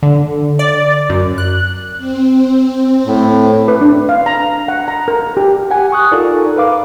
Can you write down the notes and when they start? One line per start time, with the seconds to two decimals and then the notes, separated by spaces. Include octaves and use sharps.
0.03 D3
0.59 D5
1.10 F#2
1.38 F#6
1.97 C4
3.06 A2
3.68 B4
3.81 D4
4.09 F5
4.26 A#5
4.68 F#5
4.88 A#5
5.08 A#4
5.37 G4
5.70 G4 F#5 G#5
5.92 C#6 D#6 F#6
6.11 D#4 F4 A4 A#4 D5
6.56 A#4 B4 F5 D6